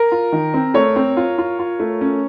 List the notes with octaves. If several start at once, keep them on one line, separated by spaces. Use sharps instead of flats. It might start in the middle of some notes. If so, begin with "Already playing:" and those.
Already playing: A#4
F4
D#3
C4
A3 C#5
C4
F4
F4
F4
A3
C#4